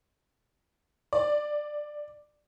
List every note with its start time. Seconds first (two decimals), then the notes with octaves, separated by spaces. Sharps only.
1.13 D5